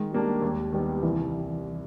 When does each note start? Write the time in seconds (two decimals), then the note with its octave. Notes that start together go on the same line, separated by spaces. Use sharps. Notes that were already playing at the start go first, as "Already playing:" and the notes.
Already playing: D#3 G#3
0.12 G3 A#3 D4
0.42 D#2
0.72 D#3 G3 B3
1.03 C2 E3